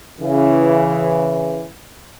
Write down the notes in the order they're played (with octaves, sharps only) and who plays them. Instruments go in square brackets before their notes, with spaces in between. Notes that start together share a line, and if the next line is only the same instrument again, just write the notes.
[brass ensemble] C#3 E3